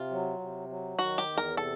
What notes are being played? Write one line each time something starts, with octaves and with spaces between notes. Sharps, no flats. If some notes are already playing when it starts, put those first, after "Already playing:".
Already playing: C3 F4
F#3
C3
F#3
D#3 F#4
G4
E2
A#4
C3 A4